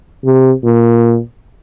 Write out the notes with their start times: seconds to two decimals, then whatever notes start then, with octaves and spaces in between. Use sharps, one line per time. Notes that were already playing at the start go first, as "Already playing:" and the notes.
0.24 C3
0.64 A#2